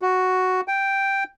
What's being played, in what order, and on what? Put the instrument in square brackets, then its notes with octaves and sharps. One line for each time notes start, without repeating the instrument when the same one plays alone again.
[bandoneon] F#4
G5